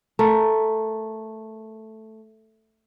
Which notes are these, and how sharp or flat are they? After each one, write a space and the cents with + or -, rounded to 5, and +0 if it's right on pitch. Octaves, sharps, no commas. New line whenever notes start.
A3 +0 A#4 +0